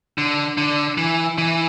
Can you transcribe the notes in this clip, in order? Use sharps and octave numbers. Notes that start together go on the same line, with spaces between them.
D3
D3
E3
E3